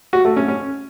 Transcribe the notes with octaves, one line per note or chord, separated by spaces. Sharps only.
F#4
A3
C#4
C#4